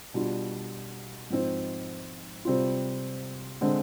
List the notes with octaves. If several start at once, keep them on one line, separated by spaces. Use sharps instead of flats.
B2 G3 D4 F4
G#2 F3 C4 D#4
C3 G3 C4 F4
D3 G#3 C4